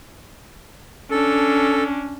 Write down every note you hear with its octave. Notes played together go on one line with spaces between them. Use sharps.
C#4 D4 A4